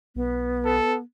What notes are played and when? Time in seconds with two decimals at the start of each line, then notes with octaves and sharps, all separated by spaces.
0.16 B1 B3
0.65 A4